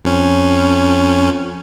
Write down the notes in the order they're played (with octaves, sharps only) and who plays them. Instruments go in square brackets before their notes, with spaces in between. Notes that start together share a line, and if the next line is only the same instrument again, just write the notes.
[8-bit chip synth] F2 C#4